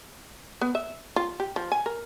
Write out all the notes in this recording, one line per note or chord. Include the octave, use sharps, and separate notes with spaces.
B3
E5
F4
G4
F3
G#5
A#4